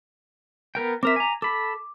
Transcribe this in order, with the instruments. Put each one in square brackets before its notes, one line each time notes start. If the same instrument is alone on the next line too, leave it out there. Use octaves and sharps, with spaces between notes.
[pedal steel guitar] B3 A#4 G5
[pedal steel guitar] C4 A#4 E5 [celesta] D6 B6
[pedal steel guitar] G#5 A#5
[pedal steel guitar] A4 B5 [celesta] D6